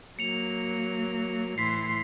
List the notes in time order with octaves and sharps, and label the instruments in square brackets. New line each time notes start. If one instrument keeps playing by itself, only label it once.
[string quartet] F#3 A#3 [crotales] C#7 F7
[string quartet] A2 E3 C6 [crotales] B6 C7